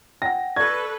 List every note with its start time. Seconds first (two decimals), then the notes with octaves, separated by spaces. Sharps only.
0.22 F#5 G5 A#6
0.56 A4 B4 D5 C#6 G#6